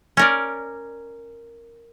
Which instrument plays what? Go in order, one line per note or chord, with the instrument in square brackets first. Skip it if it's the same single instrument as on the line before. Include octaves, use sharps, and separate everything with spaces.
[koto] C#4 A#4 D5